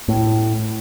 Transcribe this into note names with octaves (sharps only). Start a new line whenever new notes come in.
A2